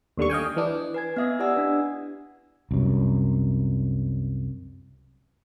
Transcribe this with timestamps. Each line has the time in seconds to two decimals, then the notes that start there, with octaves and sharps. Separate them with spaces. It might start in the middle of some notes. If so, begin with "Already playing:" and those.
0.18 D#2 D3 G3 C#6
0.30 D#5 F5 G5 G#5
0.56 E3 D4
0.94 B4 G#5 G#6
1.16 B3 D#5 E5 D#6 G#6
1.39 E4 G4 D5 F#5 G#5 E6
1.56 D4 B4
2.71 C2 F#2